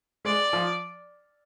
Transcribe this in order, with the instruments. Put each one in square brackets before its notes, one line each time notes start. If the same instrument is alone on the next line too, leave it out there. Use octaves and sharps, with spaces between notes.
[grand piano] G#3 [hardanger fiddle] D5
[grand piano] F3